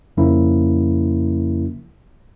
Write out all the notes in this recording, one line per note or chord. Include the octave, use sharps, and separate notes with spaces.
F2 C#3 F3 A#3 C#4 E4